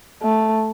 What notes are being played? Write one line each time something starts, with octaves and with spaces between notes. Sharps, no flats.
A3